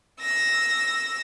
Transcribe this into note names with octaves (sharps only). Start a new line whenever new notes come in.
E6 A#6